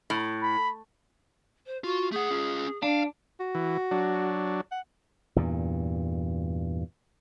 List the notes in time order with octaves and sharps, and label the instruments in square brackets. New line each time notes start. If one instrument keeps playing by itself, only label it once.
[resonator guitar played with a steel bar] A2
[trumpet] B5
[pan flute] C5
[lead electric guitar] F4 [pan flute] F#4
[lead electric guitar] A3 F#5 [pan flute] G#4
[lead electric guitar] C#4 F4
[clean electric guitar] D4 [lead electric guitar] F5
[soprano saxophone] F#4
[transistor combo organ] E3
F#3 D4
[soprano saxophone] F#5
[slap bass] E2 G2 A#2